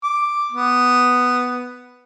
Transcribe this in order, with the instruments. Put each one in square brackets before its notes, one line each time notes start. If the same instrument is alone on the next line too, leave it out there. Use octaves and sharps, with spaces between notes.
[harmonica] D6
B3